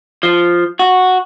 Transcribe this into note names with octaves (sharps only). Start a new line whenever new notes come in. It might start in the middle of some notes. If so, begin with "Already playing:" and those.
F3
F#4